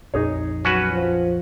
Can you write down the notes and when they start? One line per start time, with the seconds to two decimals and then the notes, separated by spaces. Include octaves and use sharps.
0.14 A#1 F2 D#4 G#4 C#5
0.65 F#3 C#4 F#4 B4
0.93 F3